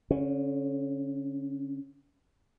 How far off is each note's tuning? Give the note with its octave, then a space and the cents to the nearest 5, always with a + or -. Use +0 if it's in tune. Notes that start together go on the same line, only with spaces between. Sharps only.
D3 -45 C#4 -15